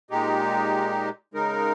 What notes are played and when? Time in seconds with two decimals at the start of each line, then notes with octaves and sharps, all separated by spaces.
0.10 A#2 G#3 D#4 G4
1.34 C#3 G#3 D#4 A#4